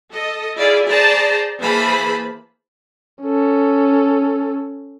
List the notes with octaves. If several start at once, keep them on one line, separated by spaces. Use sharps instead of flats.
A4 D#5
E4 F4 G#4 D5
G#4 C5 D5 A5 A#5
E3 A#3 G#4 C5 A5 B5
C#4 A4